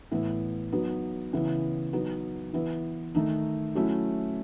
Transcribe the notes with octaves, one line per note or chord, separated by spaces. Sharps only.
A2 E3 B3 E4
F#3 B3 D#4
C#3 E3 B3 E4
F#3 B3 D#4
E3 B3 E4
D#3 A3 D#4
F#3 A3 C#4 E4